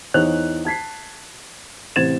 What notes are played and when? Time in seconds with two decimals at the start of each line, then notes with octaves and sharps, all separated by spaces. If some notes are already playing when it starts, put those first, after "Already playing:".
0.14 E2 D#4 C5 C#5 F#6 F7
0.65 A5 G#6 B6 C7
1.96 A1 C3 C5 G#6 A6 E7